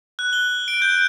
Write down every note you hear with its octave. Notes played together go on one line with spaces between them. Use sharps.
F#6
G7
D7
G6